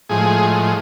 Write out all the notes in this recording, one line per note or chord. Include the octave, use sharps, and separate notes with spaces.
A2 F3 G#3 G#4